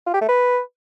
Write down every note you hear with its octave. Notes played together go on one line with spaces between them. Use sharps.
F4
G4
A3
B4